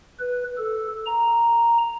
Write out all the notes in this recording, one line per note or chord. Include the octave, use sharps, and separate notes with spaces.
B4
A4
A#5